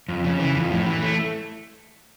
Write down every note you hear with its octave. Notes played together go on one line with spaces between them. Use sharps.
F2
C#3
E3
F2
A2
E3
A3